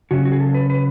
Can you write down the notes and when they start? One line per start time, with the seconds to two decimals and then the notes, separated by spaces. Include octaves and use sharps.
0.11 C#3 F#3 C#4 F#4
0.25 F#4
0.32 G#4
0.40 A4
0.54 B4
0.70 B4